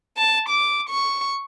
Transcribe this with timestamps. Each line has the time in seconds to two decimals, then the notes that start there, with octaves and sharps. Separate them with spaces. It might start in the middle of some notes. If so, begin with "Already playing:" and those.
0.18 A5
0.49 D6
0.89 C#6